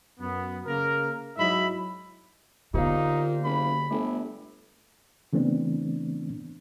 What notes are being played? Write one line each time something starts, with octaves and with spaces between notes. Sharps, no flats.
F#2 B3
C#3 A#3 A#4
G#2 F#3 E4 D#5 E5 B5
A#2 D3 B3 D#4 G4 C5 F5
F#1 B5
G1 A3 A4
C#3 E3 A3 B3 C4 D4